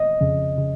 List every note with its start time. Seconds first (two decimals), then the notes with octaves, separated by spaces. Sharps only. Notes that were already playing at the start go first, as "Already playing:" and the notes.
Already playing: D#5
0.21 F2 C#3
0.57 C#3